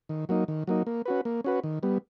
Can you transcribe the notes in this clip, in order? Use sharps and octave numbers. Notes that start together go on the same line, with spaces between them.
D#3
F#3 A#3 D#4
D#3
F#3 A#3 D#4
A#3
C#4 F#4 B4
A#3
C#4 F#4 B4
D#3
G3 B3